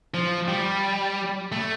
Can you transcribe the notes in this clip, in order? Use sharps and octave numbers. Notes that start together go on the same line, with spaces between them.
F3
G3
A3